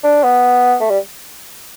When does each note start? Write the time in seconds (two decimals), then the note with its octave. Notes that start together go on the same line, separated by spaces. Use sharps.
0.03 D4
0.23 B3
0.80 A3
0.90 G3